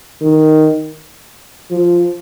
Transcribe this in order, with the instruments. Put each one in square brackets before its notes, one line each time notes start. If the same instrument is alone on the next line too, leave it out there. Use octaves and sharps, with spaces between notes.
[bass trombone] D#3
F3